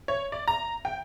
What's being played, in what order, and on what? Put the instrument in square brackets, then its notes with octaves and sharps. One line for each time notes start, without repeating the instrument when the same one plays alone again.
[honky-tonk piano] C#5
D5
A#5
G5